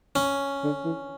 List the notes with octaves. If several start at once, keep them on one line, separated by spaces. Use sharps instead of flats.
C#4
D3
E3